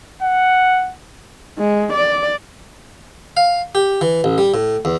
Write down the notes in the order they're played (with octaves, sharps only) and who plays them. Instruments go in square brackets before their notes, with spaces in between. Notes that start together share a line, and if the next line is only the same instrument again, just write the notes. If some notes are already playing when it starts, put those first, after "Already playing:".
[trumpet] F#5
[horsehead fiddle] G#3
D5
[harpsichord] F5
G4
E3
A1
G3
A2
E2